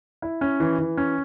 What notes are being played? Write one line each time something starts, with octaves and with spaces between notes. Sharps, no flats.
E4
C#4
E3
E3
C#4